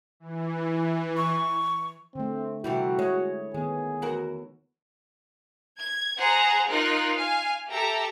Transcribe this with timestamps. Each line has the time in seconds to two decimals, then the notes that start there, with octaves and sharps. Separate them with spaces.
0.20 E3
1.17 C#6
2.15 D3 A3 C4
2.64 C3 E3 G3 E4 F#4
2.99 G#3 C#5
3.54 D#3 G#3 B3 G#4
4.02 E2 F#4 A#4
5.78 G#6
6.17 G#4 C5 F#5 A#5
6.69 D#4 F4 A#4 F#6
7.16 F5 G#5
7.69 G4 A4 E5 A#5